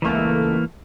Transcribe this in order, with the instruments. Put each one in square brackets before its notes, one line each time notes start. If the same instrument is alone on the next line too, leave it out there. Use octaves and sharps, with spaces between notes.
[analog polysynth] C#2 A3 [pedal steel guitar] E3 A#3